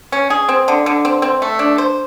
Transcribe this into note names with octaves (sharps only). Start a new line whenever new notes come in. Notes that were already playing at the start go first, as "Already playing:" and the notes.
C#4
G#4
C4
D3
D3
C4
C4
A3
D4
C5